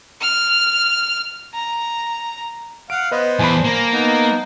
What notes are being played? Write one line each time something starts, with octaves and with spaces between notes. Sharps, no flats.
F6
A#5
F5 F#5 D7
B3 B4 C5 D#5
E2 G#5 A5 B5
A#3 A#5
B3 D#4